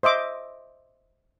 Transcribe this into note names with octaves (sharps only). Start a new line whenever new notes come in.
C5 D#5 E5 D6